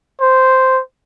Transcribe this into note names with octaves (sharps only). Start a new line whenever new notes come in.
C5